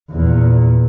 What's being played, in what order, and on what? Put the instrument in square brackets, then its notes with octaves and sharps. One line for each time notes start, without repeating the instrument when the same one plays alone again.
[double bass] E2 A#2